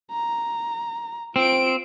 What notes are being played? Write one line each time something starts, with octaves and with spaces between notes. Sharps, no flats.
A#5
C4 F4 D7